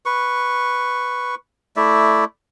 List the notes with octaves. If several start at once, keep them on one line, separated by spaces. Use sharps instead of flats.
B4 C#6
A3 E4 D5 E5